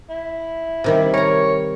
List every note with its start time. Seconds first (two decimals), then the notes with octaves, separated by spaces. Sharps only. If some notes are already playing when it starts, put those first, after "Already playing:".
0.10 E4
0.84 C3 D#3 G3
1.14 A#4 C#5 A#5